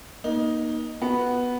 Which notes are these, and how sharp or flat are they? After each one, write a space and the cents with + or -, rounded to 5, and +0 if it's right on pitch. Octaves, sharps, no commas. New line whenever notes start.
A#3 +40 D#4 +0
B3 -5 F#4 +0